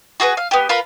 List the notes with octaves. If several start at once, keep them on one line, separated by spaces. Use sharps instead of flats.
F#4 G#4 A#4 B4
F5
B3 G4
F4 A#4 B4 B5